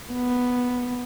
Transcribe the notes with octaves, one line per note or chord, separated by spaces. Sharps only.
B3